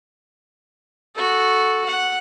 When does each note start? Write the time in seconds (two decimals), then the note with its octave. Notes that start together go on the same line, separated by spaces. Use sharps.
1.15 F#4 A4
1.86 F#5